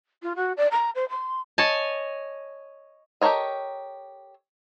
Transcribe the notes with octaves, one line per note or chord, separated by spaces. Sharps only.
F4
F#4
D5
A#5
C5
C6
C#5 D#5 G#5 A5
G4 A4 A#4 C#5 D#5